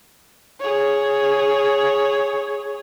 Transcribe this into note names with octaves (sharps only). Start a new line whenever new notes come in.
G#4 C#5